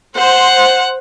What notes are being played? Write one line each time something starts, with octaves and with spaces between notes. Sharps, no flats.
C5 F#5